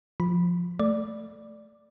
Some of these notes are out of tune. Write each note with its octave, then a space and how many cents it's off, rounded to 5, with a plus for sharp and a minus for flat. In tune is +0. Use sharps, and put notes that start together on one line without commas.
F3 +5 B5 -10
A3 +0 D5 +0